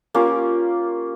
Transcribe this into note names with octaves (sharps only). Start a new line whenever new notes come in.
A#3 C#4 F4 G4